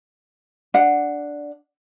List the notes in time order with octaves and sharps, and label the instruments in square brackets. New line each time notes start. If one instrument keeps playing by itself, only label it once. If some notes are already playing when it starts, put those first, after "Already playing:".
[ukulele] D4 F#5